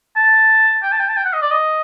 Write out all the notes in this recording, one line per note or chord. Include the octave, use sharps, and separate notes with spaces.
A5
G5
A5
G5
A5
G5
F#5
D#5
D5
D#5